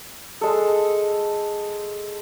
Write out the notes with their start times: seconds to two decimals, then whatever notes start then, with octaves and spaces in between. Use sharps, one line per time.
0.41 G#3 A4